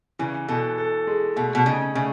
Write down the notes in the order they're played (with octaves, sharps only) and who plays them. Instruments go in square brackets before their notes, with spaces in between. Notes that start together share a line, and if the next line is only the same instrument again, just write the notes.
[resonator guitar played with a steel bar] C#3 [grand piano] E3
[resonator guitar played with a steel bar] B2 [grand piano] A4
[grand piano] A4
G#3
[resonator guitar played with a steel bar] B2 [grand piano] A3
[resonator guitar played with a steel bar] B2
[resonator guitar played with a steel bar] C#3 [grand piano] D#4
[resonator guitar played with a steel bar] C#3 [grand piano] A3